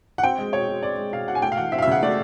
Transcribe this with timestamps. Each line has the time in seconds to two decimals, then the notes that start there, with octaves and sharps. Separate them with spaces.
0.18 F#5
0.23 C4 G5
0.38 G#3
0.53 B2 C#5
0.68 B2
0.83 C4 D5
0.97 G#3
1.12 B2 F5
1.28 B2 F#5
1.35 G#5
1.42 A3 G5
1.52 F5
1.57 E3 F#5
1.72 C4 E5
1.78 F5
1.82 E5
1.87 C#3 F#5
2.03 A3 D5